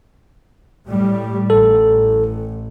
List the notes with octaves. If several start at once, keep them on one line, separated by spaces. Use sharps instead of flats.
A2 G3
A1 A4